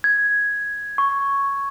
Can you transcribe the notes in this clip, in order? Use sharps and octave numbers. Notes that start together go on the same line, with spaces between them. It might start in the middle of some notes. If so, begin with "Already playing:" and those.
G#6
C#6